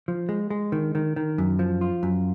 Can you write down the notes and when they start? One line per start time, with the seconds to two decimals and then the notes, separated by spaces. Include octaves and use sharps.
0.08 F3
0.29 G#3
0.50 G#3
0.72 D#3
0.95 D#3
1.16 D#3
1.38 F#2
1.59 F3
1.81 F4
2.03 F#2